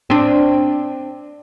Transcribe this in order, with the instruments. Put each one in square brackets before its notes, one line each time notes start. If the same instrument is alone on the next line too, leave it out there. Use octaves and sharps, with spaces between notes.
[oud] C4 D4